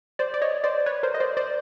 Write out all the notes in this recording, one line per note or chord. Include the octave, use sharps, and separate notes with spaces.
C5 D5
D5
C#5 D#5
C5 D5
B4 C#5
A#4 C5
D#5
C5 D5
C5 D5